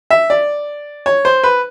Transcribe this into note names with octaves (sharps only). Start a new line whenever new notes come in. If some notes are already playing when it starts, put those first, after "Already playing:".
E5
D5
C#5
C5
B4